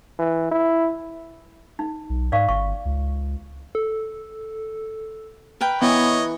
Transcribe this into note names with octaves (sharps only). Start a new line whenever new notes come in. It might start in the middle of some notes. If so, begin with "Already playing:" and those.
E3
E4
D#4
B1
G#2 D5 F5 C#6
G1 C#6
C#2
A4
A#4 B4 G5
E3 B3 C#5 D#5